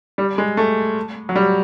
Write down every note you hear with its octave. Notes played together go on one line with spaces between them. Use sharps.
G3
G#3
A3
F#3
G3